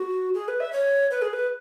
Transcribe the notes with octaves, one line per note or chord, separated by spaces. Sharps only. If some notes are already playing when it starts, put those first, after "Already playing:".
Already playing: F#4
G#4
B4
E5
C#5
B4
G#4
B4